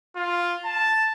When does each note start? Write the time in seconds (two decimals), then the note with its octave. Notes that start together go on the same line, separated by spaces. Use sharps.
0.16 F4
0.65 A5